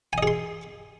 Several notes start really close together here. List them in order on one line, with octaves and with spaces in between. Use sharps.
G#5 D#5 G#4 C6